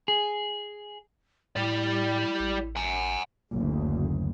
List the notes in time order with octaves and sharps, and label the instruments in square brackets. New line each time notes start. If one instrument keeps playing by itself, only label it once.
[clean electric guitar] G#4
[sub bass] A2 [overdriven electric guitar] G3 D5 [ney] E4
[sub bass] A1
[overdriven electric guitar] F#5 G#5
[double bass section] F#1 D2